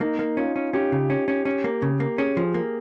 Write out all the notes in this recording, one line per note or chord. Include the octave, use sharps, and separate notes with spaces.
A#3 D#4
A#3
C#4 F4
C#4
C#4 G4
C#3
C#4
C#4
C#4
A#3
C#3
A#3
C#4 G#4
F3
A#3